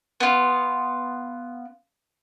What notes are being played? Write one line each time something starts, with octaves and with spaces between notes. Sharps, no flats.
B3 F4